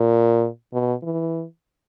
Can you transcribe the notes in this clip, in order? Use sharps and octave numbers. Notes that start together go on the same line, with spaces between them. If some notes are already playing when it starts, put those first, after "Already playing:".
Already playing: A#2
B2
E3